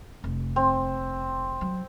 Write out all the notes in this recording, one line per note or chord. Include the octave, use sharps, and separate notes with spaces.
F1
C4
F#3